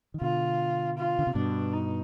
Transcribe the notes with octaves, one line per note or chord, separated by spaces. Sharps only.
D#3
B2 D3 F4
F4
D3
C3
G2 B2 D4
D#4